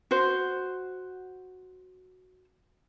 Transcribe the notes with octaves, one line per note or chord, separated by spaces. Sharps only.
F#4 C5